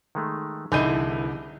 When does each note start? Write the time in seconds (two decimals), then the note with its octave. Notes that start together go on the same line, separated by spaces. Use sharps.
0.15 D#3 G#3 A3
0.72 C2 D3 E3 D#4 E4 G#4 G6 D#7